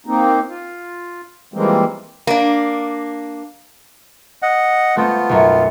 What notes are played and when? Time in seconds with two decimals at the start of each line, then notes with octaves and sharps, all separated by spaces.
0.06 A#3 C4 D#4
0.49 F4
1.54 E3 F3 G3 G#3 A#3 C4
2.27 A#3 D4
4.42 D#5 F#5
4.97 A3 B3 C4 F4
5.29 B1 F#2